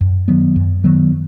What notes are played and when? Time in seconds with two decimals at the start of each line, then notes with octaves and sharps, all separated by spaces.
0.01 F#2
0.28 D#3 F#3 B3
0.56 F#2
0.84 D#3 F#3 B3